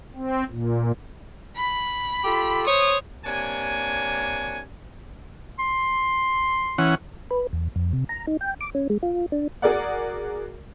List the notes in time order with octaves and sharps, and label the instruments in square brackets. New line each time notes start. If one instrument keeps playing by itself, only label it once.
[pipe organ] C4
A#2
[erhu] B5
[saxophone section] F4 G4 A4
[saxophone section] C5 C#5 [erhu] D#6
[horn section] C3 A#3 D4 C#5 G#5
[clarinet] C6
[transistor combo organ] E3 C#4 F#5
[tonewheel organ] B4
E2
F2
C3
A#5
D#4
G5
D6
C#4
G#3
F4
D4
[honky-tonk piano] F#4 G#4 A#4 D5 F#5